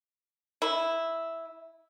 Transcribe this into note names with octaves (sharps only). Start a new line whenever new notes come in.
E4